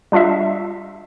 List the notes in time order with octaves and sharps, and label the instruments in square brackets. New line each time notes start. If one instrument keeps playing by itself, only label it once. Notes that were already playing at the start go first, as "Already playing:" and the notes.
[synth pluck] G3 D4 F4 D#5 E5